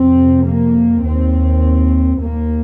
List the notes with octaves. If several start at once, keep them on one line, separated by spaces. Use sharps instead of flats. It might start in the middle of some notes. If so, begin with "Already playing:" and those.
Already playing: F2 C3 C4
A#3
D#2 C4
D#2 A#3